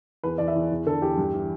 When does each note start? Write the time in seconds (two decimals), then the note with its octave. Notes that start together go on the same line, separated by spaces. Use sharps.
0.24 E2 B4
0.38 E2 D5
0.48 E5
0.55 E2
0.71 E2
0.86 D3 A4
1.01 E2 G4
1.17 G2
1.33 E3